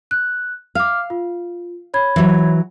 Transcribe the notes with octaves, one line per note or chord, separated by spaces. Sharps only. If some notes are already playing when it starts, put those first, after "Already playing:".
F#6
F5 D6 F6
F4
C#5 B5 G#6
E3 F#3